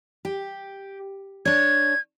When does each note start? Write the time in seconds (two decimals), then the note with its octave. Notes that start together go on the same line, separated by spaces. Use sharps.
0.25 G4
1.45 D4 C#5 G#6